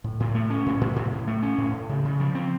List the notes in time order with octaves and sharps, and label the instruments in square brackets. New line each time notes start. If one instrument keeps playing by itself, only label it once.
[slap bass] A2
A2
A3
C#4
A2
A2
A2
A2
A3
C#4
A2
A2
C#3
C#3
F3
C4